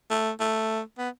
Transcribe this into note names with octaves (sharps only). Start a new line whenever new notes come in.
A3
A3
B3